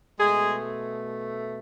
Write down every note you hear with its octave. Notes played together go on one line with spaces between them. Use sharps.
B2 G#3 A3 G#4